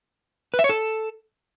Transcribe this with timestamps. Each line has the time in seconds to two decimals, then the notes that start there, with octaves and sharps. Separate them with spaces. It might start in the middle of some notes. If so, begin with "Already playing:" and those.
0.54 B4
0.59 E5
0.64 C#5
0.69 A4